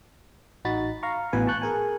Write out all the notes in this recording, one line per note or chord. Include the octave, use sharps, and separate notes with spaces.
A1 D#4 F#4 B5 A6
F5 A#5 C#6
A1 B2 E3 B4 G#5
A5 C#6 F#6 G6
G#4 A#4 G#5